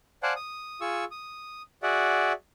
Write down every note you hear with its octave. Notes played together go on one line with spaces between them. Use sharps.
C5 D5 F5 F#5 G#5 A5
D#6
F4 G#4 C#6 E6
D#6
F#4 G#4 D5 E5 F#5